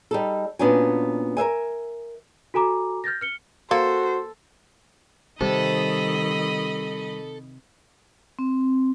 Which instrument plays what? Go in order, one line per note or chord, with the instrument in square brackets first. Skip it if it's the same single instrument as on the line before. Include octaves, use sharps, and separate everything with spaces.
[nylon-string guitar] G3 D#4 A4
A#2 B3 C#4 D4 F#4 G#5
A#4 C5 E5 G#5
[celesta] F#4 A4 G#5 A#5 D6
F6 G6 A6 A#6
F6 C#7 G7
[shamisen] A#3 [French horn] F#4 [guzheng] A4 [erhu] C5
[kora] C3 [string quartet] D#3 D#5 B5 [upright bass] G3 [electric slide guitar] A4
[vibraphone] C4